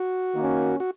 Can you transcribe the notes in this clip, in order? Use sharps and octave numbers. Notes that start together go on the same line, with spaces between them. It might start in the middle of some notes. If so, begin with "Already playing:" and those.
Already playing: F#4
D#3 A#3 C#4
F#4